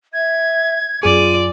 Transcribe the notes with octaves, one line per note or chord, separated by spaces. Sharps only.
E5 G#6
F#2 F4 G#4 D5 D#7